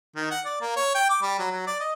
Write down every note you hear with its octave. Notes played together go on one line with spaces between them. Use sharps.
D#3
F#5
D5
A#3
C#5
G5
D6
G3
F#3
F#3
D5
D#5